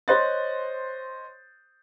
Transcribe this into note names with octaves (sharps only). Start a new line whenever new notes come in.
C5 C#5 D#5 C6 F#6 A6